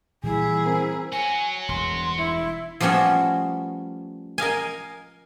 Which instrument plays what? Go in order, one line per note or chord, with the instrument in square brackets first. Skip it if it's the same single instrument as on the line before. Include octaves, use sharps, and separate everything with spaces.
[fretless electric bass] A#2 E3 G3 [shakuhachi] E4 [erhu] G#4
[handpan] C4 A#4
[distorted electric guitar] F#4 C#5 [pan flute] G#5
[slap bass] E1 G2 [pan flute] C6
[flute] E4
[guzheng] F3 G3 A3 B3 C#4 F#4
A#4 D#5 F5 G#5